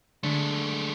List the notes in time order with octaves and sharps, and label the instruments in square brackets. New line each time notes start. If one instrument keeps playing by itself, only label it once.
[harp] D3 [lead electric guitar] G#3 A3